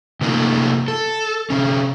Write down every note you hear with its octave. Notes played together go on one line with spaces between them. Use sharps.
C3 A3 A#3 D#4 F4 A4
A4
C3 C#4